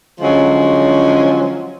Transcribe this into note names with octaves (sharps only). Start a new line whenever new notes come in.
D3 F3 F#3 G#3 C#4